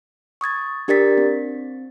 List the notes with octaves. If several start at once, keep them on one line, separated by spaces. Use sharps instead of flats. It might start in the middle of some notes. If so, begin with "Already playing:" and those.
C#6 D#6 G#6 A6
D4 G4 A#4 D5 A6 B6
C4